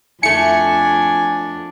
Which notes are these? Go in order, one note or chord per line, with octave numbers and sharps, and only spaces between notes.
F2 A3 D4 E4 G#5 C#7